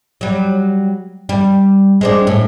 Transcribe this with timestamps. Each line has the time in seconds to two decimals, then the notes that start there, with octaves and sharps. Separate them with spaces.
0.21 F#3 G3
1.29 G3
2.01 G#3 C4 D4
2.27 A2